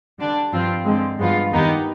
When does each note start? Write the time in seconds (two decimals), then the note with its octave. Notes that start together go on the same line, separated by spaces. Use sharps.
0.19 D3 G3 D4
0.52 G2 F3 C4 F4
0.85 D3 G#3 C4
1.18 G2 F3 G#3 B3 F4
1.51 D#2 D#3 B3 D#4 G4